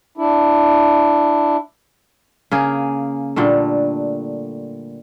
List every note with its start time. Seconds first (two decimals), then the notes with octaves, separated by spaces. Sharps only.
0.17 D4 E4
2.51 C#3 A#3 G#4
3.36 A#2 D3 G3 A3